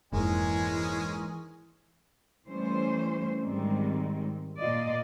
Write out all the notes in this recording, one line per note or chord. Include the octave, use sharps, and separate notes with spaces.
F1 G#2 E3 G#3 A#3 C#4 G#4
E3 G3 A3 C#4 C5
G#2 D#3 G3 G#3 C4
A#2 F4 D5 D#5